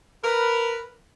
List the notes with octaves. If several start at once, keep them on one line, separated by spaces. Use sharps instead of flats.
A#4 B4